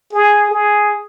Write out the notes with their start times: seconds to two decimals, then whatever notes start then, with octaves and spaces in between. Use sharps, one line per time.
0.13 G#4
0.51 G#4